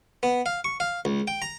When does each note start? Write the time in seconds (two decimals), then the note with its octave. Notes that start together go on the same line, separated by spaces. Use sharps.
0.23 B3
0.46 F5
0.64 C#6
0.80 F5
1.05 C#2
1.28 G5
1.42 A#5